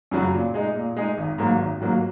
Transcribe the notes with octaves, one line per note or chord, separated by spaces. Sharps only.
F#2 C#3 F#3
A#2
G#3 D#4 G#4
A#2
G#3 D#4 G#4
G#1
G#2 F#3 A#3
G#1
G#2 F#3 A#3